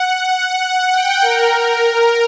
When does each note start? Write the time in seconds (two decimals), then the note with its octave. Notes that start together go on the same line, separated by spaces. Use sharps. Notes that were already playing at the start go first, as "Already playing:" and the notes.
Already playing: F#5
0.32 F#5
0.92 G5
1.22 A#4
1.82 A#4